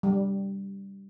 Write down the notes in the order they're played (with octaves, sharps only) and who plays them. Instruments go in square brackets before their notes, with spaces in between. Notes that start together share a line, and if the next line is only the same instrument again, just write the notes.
[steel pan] G3